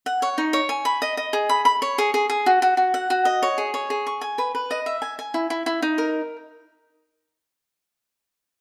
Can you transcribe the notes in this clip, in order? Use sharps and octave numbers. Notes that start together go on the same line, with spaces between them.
F#5
C#5
D#4
C#5
G#5
B5
D#5
D#5
G#4
B5
B5
C#5
G#4
G#4
G#4
F#4
F#4
F#4
F#5
F#4
D#5
C#5
G#4
C#5
G#4
C#6
G#5
B4
B4
D#5
E5
G#5
G#5
E4
E4
E4
D#4
A#4